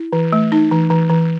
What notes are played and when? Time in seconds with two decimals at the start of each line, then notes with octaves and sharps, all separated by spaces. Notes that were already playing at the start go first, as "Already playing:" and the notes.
Already playing: E4
0.12 E3
0.33 A3
0.52 D#4
0.71 E3
0.90 E3
1.09 E3